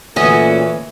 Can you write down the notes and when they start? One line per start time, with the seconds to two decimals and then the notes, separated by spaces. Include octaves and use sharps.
0.16 A#2 E3 A3 C#4 F#4 D#5